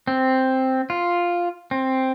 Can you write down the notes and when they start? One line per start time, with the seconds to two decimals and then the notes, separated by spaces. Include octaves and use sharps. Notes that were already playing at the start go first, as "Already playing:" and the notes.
0.07 C4
0.90 F4
1.71 C4